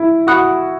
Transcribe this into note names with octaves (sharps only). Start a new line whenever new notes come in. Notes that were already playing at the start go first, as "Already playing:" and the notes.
Already playing: E4
F#4 F#5 B5 D#6 F#6